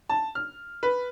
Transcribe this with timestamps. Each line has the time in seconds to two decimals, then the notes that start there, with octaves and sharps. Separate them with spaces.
0.09 A5
0.35 F6
0.83 B4